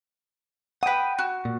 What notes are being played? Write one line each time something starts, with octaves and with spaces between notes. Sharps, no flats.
B4 F#5 G5 D#6
F#4
A#2